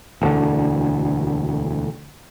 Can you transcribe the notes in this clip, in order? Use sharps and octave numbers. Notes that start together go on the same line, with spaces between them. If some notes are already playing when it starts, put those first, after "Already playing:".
E1 D2 D3